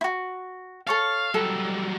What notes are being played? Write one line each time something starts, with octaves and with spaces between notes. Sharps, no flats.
E4 F#4
A4 C#5 F5 A5
F#3 G3 A4